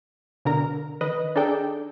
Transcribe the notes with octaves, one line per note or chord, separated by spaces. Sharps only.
B2 D3 A#4 A#5
D#3 B4 D#5
D4 D#4 G#4 A4 D5 G5